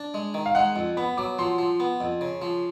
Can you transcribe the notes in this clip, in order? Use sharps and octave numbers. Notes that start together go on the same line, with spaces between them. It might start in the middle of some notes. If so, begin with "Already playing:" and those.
Already playing: D4
G#3
D#3
F5
G#3 F#5
F2
B3 B5
F#3 D6
F3 C6
F3
B3
F2
C#3
F3